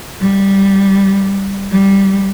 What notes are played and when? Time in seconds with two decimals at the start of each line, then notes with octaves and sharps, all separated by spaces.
0.21 G3
1.71 G3